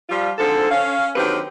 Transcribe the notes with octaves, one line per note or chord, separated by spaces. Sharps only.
F3 G3 F4
G#2 D3 F3 C4 A4
C#4 F5
D3 D#3 F#3 C4 G4 B4